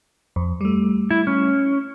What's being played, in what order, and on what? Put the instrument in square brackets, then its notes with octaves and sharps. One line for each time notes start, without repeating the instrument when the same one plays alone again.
[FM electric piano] F2
G3 A3
[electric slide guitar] E4
C#4